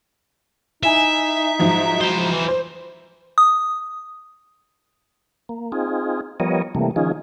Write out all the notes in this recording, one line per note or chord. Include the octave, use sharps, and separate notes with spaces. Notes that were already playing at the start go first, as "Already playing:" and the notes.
D#4 E4 E5 G#5
G#2 F3 F#3
E4 C5
E3
C5
D#6
A#3
C4 D#4 F4 G#4
F3 G3 B3 A#4 C#5 D#5
C3 E3 G3 A3 A#3
D#3 F3 C#4 D#4 F4 G#4